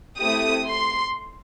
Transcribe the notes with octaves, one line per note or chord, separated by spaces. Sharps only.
A3 C4 E4 G4 D#6
C6